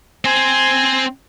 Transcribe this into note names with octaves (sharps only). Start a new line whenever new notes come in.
C4 C5 G#5